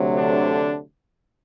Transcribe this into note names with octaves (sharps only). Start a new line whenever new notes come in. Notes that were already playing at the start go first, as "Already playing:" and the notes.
Already playing: D2 C3 F#3
D3 D4